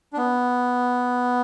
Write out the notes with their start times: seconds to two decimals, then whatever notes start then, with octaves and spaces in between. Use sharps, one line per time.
0.13 D4
0.17 B3